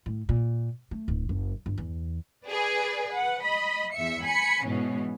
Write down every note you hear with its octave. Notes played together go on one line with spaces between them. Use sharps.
A2
A#2
A3
D1
F#1
G1
E2
G#4 B4 D5
B4 F#5
D#5 B5
E2 E5 C#7
G#5 B5 B6 C#7
G#2 B2 E3 C#4